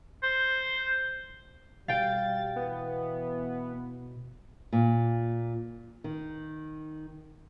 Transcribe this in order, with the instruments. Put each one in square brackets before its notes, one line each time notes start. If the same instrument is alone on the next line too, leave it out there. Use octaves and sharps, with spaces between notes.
[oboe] C5
[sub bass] B2 [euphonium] G3 [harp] F5 G5 [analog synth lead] A6
[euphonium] E3 [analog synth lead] B3
[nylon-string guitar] A#2
D#3